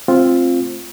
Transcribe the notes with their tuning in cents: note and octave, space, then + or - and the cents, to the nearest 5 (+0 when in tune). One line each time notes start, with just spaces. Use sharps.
A3 -15 C4 +10 F4 +0